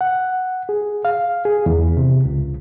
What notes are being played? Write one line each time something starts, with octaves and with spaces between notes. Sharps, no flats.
F#5
G#4
F5
G#4
E2
C3
C#2